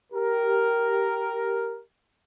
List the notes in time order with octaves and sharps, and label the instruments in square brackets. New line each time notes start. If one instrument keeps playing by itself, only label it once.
[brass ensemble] G4 A#4